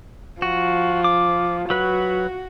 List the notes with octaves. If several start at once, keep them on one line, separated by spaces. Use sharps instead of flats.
F3 F#4
D6
F#3 F#4 B4